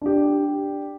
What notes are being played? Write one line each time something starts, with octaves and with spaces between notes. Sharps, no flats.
D4 G4